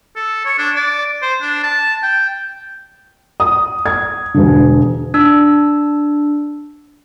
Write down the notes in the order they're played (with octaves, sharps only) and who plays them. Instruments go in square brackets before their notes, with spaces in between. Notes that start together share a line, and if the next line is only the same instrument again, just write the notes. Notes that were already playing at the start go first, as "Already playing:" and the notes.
[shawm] A4
C#5
D4
D5
C5
D4
A5
G5
[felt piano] D#6
G#6
E1 D3
[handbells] D4 E6